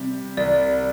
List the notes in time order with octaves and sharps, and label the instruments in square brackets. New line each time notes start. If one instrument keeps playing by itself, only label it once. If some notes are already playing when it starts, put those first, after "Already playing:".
Already playing: [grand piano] C3 G3
[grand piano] C2 [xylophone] D5